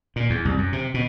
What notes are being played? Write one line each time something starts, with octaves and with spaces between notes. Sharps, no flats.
A#2
E2
C2
F#2
C3
B2